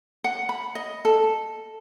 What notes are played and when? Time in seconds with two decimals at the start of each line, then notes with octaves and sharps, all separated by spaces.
0.24 F#5
0.49 B5
0.75 D#5
1.05 A4